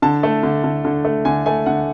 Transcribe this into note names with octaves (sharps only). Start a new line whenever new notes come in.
D3 A5
A3
D3
D3
D3
A3
D3 G#5
A3 G#5
D3 F#5